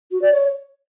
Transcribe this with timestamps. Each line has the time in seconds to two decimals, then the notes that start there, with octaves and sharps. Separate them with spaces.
0.11 F#4
0.21 D5
0.32 C#5